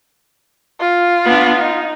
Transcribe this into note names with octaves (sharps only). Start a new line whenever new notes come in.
F4
B3 D4
D#4